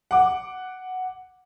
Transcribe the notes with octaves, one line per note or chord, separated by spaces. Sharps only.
F#5 D6